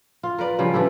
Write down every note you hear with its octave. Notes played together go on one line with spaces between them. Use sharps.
F4
A#4 B4 D5
C#3 F3 G3 G4
E3 D4 G4 A4